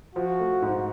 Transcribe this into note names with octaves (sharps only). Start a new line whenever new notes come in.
F3 F#4
A3
G#2